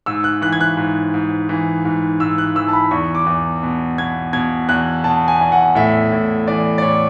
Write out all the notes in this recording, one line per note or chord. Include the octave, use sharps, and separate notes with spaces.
G#2 E6
F#6
E3 F#6
G#6
F#6
G#2
G#2
E3
G#2
G#2 E6
F#6
E3 E6
A5
B5
E2 C#6
D6
E2
B2
B2 G#6
B2 G#6
E2 F#6
B2 A5
G#5
E2
F#5
A2 E5
A2
E3 D5
D5
A2 C#5